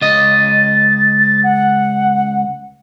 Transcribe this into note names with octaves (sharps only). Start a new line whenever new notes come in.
C#2 D#5 A6
F#5